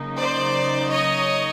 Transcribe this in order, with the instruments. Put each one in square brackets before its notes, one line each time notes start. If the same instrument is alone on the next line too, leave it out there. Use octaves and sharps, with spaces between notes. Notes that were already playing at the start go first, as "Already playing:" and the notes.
Already playing: [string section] C#3 F#3 A#3 D#4
C5 D5
C#5 D#5